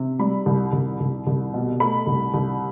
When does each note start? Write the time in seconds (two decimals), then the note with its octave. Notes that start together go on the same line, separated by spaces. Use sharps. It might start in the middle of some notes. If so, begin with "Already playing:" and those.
Already playing: C3
0.19 G3 B5
0.46 C2
0.73 C2
1.00 C2
1.27 C2
1.54 B2
1.80 A3 B5
2.07 C2
2.34 C2